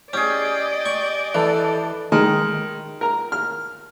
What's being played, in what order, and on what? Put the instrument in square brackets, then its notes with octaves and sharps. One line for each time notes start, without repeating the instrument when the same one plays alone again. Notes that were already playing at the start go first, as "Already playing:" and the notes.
[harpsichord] C#4 [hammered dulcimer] G4 G#4 [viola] D5 D#5
[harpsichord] C#6
[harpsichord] E3 [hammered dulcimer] D4 [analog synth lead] A4
[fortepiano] D#3 G#3
A#4 A#5
F6